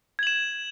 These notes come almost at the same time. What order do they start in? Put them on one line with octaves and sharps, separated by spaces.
G#6 F#7 E7